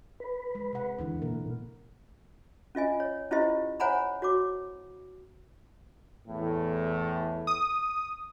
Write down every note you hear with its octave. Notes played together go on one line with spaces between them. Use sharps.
B4
G#3
C3 F#5
D2 D3 E3 E4
A#2 A#4
C#4 F4 D#5 G#5
C#5
C#4 E4 F4 G4 C5 D#5
C5 C#5 F#5 G#5 A#5 B5
F#4 C#5 D6
E2 A2
D#6